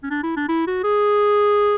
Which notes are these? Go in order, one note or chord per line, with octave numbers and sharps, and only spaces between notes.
C#4
D4
E4
D4
E4
F#4
G#4